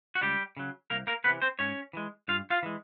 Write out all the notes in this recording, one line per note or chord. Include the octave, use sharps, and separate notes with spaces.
F#4
C#2 G3 G4
C#3 F#3
C2 A#3 A#4
A#3 A#4
C3 E3 B3 B4
C4 C5
G#2 C#4 C#5
E3 G#3
G2 F4 F5
F4 F5
E3 G#3